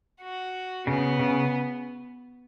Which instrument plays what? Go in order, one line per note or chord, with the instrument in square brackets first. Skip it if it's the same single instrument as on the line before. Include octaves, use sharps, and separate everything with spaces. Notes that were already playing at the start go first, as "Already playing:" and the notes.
[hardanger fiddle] F#4
[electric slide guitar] C#3 [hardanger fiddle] B3
[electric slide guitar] C#3